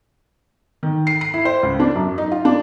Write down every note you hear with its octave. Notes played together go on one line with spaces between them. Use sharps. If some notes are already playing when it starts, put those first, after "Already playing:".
D#3
C7
C7
E4
C5
C#2
D4
F#2
D#4
F4
D4